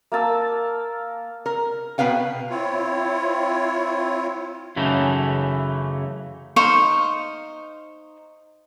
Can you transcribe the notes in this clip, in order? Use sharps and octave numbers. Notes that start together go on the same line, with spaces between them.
A#3 A#4 A5 E6
A#4
B2 B3 D4 B4 F5 G5
C4 E4 F4 C#5
F#2 C#3 E3 A3 D#4
D#4 C5 F5 C#6